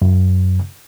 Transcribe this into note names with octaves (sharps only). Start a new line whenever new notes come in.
F#2